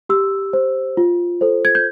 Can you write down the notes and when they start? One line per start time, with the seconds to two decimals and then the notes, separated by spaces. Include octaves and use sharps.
0.09 G4 E6
0.53 C5
0.97 F4
1.41 A4 C5
1.65 G#6
1.75 G6